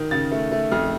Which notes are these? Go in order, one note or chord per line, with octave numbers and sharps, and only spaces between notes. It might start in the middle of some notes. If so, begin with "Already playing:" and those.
Already playing: D#3
C#3 A6
A3
A3
F2 F6